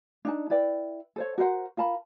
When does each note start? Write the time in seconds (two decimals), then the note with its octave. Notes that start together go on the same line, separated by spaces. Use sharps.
0.25 D4 D#4 A5
0.50 E4 B4 D5 G5
1.16 A4 C5 C#5
1.38 F#4 A#4 C5 F#5
1.77 F4 A#4 A5 B5